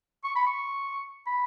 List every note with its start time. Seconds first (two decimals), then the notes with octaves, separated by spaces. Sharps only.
0.24 C#6
0.35 B5
0.46 C#6
1.27 B5